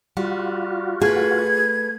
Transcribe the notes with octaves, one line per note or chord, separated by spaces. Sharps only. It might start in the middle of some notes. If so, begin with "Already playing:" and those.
G3 F4 F#4
A3 G#4 B4 G#6